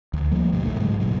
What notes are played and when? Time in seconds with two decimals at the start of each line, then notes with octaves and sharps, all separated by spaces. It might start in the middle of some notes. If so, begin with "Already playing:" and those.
0.14 D2
0.31 F3 G3 A3 A#3
0.53 D2 G2 B2
0.66 A#1 E2 A3
0.80 G#2 C#3 F#3 G#3
1.00 F#1 G2 A#2 F#3